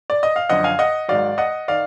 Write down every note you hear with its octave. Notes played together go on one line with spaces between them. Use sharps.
D5
D#5
F5
F#2 D3 F3 D#5 F#5
F5 G#5
D#5 F#5
G#2 D#3 F#3 D5 F5
D#5 F#5
D#3 D5 F5